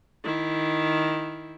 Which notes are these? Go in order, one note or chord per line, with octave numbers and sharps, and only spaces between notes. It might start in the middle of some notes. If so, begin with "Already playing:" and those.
D#3 E4